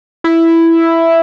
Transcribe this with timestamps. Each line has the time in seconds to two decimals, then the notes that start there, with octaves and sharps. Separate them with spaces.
0.24 E4